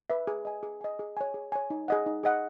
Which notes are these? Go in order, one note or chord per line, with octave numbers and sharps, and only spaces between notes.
B4 E5
G#4
D#5 G#5
G#4
D#5 G#5
G#4
C#5 G#5
G#4
C#5 G#5
D#4
G#4 D#5 F#5
D#4
G#4 D#5 F#5